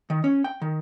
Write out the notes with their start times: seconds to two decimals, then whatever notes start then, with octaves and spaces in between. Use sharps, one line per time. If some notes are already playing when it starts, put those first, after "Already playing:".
0.10 D#3
0.24 C#4
0.44 G5
0.62 D#3